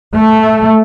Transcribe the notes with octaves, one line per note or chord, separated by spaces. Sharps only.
A3